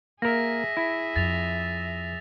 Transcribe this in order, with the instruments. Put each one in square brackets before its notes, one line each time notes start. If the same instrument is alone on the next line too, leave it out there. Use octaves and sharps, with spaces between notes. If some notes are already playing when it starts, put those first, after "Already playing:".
[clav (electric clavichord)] A#3 A#4 [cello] G#4 E5 [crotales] A#6
[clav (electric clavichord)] E4
[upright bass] F2 [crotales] A6 F7